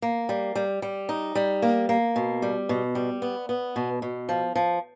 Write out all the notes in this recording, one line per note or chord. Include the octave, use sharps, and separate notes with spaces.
A#3
G3
G3
G3
D#4
G3
A#3
A#3
B2
G3
B2
G3
B3
B3
B2
B2
F3
F3